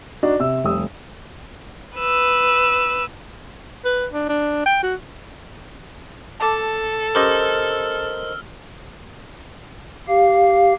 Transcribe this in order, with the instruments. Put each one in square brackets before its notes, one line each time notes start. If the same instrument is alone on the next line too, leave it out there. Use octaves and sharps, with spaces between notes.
[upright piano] D4 D#4 F#4
C3 E6
F1 G3 D#6 E6
[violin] B4 E6
[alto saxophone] B4
D4
D4
G5
F#4
[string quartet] A4 [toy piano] A5 D6 E6
[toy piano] C#4 G4 D6 [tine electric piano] A#4 C5 D#5 [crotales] E6 F6
[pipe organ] G4 F5